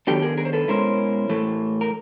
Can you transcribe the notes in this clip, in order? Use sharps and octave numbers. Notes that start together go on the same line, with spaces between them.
D#3 F#3 B3 D4 G4 A4
G#4 A#4
G#4 A#4
C5
A4 B4
B2 G#3 C#4 E4 A#4 C5
A2 E3 A3
A#4